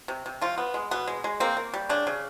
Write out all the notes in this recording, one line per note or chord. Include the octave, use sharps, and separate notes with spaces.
C3
C3
F3 F4
B3
G#3
B2 B3
G#3
G#3
A#3 C4
A#3
G3
C#3 D4
C#3